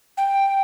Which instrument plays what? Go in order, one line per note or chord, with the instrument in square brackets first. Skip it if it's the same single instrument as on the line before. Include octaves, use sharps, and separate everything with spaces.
[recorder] G5